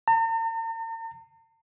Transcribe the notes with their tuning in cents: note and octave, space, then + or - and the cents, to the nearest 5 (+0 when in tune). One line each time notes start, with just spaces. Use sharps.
A#5 -45